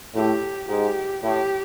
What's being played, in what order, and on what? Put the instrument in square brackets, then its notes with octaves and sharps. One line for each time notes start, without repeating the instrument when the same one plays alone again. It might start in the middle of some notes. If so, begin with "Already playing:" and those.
[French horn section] A2 [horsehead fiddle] G4
[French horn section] G#2 [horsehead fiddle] G4
[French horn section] A2 [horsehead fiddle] G4